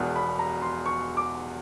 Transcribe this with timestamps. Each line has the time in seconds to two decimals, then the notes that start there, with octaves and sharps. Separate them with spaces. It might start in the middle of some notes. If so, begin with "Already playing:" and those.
Already playing: E1 E2 B2
0.16 B5
0.39 A#5
0.62 C6
0.86 C#6
1.17 D6